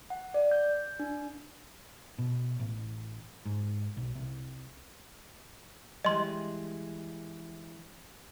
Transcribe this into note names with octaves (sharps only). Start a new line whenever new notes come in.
F#5
D5
G6
D4
B2
A1
G#2
B1
C2
E3 G3 G#3 D#5 C6